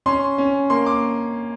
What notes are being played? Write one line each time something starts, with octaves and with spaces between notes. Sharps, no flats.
C#4 C6
C#4
A#3 C6
D6